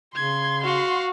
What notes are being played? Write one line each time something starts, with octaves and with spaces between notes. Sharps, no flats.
C#3 C6 G#6
F#4 F5